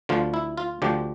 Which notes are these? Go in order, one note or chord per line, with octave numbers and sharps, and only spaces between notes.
D2 D3 F3 F4
E4
F4
D2 D3 F3 G4